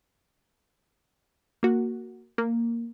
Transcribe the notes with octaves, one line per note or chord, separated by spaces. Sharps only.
A#3 F#4
A#3